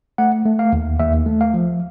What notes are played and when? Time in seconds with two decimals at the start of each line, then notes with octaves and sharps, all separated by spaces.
0.18 A3 F#5
0.45 A3
0.59 F5
0.73 D#2
1.00 D#2 E5
1.26 A3
1.41 F5
1.54 F3